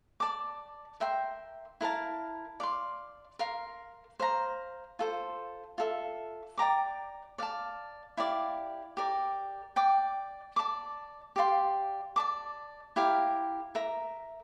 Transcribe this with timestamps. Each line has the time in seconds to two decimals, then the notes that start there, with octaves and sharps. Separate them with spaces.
0.20 D5 A5 D6
1.00 A#4 E5 G5 C6
1.81 E4 A#4 F5 A5
2.60 D5 F5 C6
3.39 A#4 F5 C6
4.20 C5 F5 A#5
4.99 F4 A4 C5
5.78 F4 A4 E5
6.58 D5 G5 A#5 D6
7.38 D5 F5 A5
8.17 E4 G4 D5 F5
8.97 G4 A#4 D5
9.76 D5 G5 D6
10.56 D5 A5 D6
11.36 G4 D5 F5 C6
12.16 D5 A5 D6
12.96 E4 G4 A#4 F5
13.75 A#4 E5 A#5